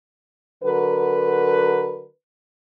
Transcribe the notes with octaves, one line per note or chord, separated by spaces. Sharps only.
D3 F#3 A#4 B4